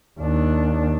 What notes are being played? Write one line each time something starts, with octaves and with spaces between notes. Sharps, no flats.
D#2 D4